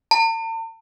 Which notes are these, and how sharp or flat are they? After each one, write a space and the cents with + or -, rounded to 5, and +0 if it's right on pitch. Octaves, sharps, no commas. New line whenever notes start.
A5 +45